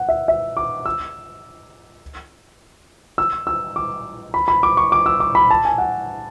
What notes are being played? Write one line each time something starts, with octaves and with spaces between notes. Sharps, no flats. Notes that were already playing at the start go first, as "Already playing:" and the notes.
Already playing: F#5
E5
E5
D6
E6
E6
E6
D6
B5
B5
D6
C#6
D6
E6
D6
B5
A5
G#5
F#5